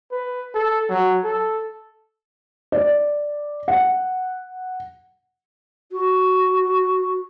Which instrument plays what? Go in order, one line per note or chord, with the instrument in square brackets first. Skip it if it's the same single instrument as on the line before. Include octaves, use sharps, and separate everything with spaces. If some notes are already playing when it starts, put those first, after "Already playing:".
[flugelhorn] B4
A4
F#3
A4
[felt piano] D5
F#5
[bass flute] F#4